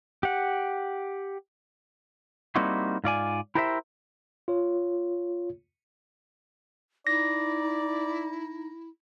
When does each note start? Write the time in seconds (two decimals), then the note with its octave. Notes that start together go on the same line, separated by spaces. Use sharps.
0.23 G4 F#5
2.56 G3 A#3 C4 D#4 E4 F#4
3.04 G#2 F4 D5 G#5
3.55 E4 G4 A#4 C5 D5 E5
4.48 F4 C#5
7.07 D#4 E4 D5 A#6